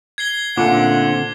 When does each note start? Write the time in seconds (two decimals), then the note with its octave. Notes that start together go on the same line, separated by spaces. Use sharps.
0.18 G#6 C7 G7
0.57 A#2 D3 A3 C4 C#4 F#5 D6